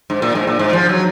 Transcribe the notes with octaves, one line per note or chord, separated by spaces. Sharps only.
G#2
A#2
G#2
A#2
G#2
F3
F#3